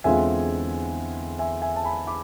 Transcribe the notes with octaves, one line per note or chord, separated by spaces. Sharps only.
E2 D3 G#3 C4 F4 E5 G#5
E5 G#5
E5 G#5
A5
G#5 B5
B5 D6